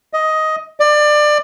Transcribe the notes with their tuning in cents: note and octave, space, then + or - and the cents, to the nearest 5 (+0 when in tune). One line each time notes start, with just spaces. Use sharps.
D#5 +10
D5 +25